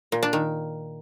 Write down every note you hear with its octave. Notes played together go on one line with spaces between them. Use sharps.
A#2
D4
D#3